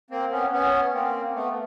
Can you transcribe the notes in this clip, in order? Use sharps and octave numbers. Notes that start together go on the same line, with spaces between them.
A#3 C4
B3 C#4
B3 C#4
A#3 C4
A3 B3